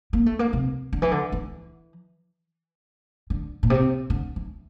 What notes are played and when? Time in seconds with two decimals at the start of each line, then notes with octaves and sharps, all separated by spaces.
0.13 A#3
0.26 A3
0.39 A#3
0.53 C3
0.93 D3
1.02 E3
1.12 D3
1.32 E3
3.30 D3
3.63 A#2
3.70 C3
4.10 D3
4.36 E3